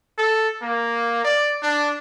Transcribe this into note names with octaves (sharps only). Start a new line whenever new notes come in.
A4
A#3
D5
D4